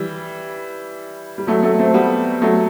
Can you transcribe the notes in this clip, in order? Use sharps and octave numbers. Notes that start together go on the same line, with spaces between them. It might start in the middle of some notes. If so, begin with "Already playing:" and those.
Already playing: E3 G3
G3
F#3 A3
F#3 A3
A3 C4
G3 B3
F#3 A3